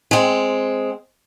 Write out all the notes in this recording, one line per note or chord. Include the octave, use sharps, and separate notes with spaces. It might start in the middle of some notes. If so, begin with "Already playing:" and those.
G#3 C4